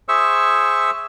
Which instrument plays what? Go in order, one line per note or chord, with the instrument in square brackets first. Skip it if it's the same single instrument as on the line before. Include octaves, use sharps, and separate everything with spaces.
[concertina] G#4 C5 E5 C#6 E6